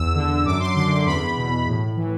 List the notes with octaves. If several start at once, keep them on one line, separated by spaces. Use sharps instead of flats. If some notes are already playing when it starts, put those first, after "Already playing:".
Already playing: E2 E6
D3
F#2 D6
C6
D3 C6
C6
E2 B5
B2
A2
E3